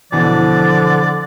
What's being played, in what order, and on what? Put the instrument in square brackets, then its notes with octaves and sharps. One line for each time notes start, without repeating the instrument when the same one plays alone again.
[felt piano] E2 B2 E3 [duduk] D3 [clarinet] F3 [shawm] D5